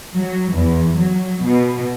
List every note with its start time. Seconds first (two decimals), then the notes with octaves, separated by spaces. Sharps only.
0.19 F#3
0.54 E2
0.99 F#3
1.45 B2